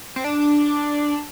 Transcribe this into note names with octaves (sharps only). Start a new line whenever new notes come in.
C4
D4